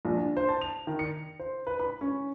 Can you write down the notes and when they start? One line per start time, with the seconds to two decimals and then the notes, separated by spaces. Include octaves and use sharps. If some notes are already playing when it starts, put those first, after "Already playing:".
0.05 A#1
0.17 D4
0.37 C5
0.49 A5
0.61 F7
0.87 D#3
0.99 C#7
1.39 C5
1.67 B4
1.80 B5
2.01 C#4